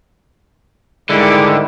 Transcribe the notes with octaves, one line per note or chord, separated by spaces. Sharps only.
G#2 D3 D#3 G3 G#3 E4 D6